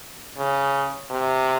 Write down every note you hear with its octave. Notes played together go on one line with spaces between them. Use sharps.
C#3
C3